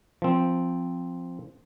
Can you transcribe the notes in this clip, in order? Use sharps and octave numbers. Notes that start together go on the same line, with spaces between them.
F3 C4